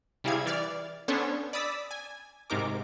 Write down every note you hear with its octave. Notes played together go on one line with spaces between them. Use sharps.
C3 G3 E4 G#4 F5 G#6
E3 D5 F6
B3 C#4 D4 A4 C5 C#5
D5 B5 D#6 E6 A6 B6
G#5
G#2 C3 D#4 A#4 D6